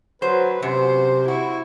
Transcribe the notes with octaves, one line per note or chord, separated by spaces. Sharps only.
F#3 B4 C5
F#2 C3 C5
E4 F#4